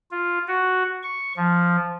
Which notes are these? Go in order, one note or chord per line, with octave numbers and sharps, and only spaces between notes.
F4
F#4
C#6
F3